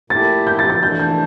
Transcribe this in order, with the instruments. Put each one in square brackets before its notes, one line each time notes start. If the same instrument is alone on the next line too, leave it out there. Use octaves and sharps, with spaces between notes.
[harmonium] A#2 A3 E4 G4 [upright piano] A6
[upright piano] G6
A6
A6
[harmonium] E3 A3 D4 [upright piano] G6
[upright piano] G6